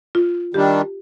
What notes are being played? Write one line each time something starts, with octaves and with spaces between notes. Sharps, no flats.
F4
D#3 G3 D4 G4